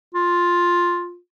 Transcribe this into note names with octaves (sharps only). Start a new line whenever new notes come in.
F4